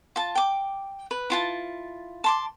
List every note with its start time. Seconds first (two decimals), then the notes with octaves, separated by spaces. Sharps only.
0.16 F4 A5
0.35 G5 D6
1.11 B4
1.30 E4 F4 A5
2.24 A5 C6 D6